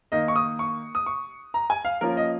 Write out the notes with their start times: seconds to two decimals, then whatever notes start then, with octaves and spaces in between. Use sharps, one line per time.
0.12 D#3 A#3 D#4 D#5
0.28 C#6
0.36 D#6
0.59 C#6
0.95 D#6
1.06 C#6
1.54 A#5
1.70 G#5
1.85 F5
2.01 F3 A#3 C#4 F4 A#4
2.17 D#5